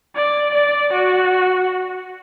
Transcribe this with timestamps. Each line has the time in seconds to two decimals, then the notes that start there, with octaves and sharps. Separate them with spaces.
0.16 D5
0.54 D5
0.93 F#4